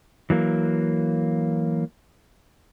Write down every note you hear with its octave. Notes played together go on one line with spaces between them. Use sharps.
E3 F#3 A#3